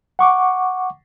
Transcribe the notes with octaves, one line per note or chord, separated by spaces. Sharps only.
F#5 C#6 D6